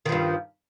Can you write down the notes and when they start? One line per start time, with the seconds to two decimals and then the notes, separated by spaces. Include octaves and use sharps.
0.06 D#3
0.09 F3
0.12 G2